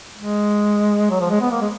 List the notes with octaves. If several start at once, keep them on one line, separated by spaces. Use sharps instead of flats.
G#3
F#3
F3
G#3
B3
A#3
G#3